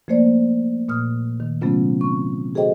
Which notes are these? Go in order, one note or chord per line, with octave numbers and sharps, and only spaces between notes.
F3 A3 A#3 C5 D5
A#2 D#6 F6
D#3
C3 F#3 A3 B3 C#4 F4
C4 C#6
F#4 G#4 A4 C5 D#5 G5